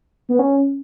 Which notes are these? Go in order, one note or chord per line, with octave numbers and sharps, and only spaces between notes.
B3
C#4